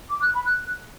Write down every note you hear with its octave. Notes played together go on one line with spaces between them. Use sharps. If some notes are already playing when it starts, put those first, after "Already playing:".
D6
F#6
B5
F#6